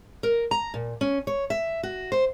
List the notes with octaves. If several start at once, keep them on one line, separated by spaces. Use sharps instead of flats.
A#4
A#5
A#2
C#4
C#5
E5
F#4
C5